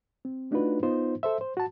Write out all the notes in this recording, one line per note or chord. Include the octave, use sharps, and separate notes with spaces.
C4
A3 D4 D#4 F4 F#4 B4
B3 D#4 F4 C5
A4 C5 E5
C5
F#4 A5